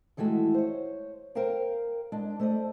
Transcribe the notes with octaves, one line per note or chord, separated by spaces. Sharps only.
D#3 E3 G#3 A3 F#4
C5 C#5
A#4 C5 F5 G5 A#5
G#3 D4 D#5
A3 C5 D5 D#5